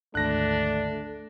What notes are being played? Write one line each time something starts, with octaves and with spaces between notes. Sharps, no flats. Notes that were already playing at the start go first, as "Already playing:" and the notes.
G#1 D2 A3 D4 F#6 A#6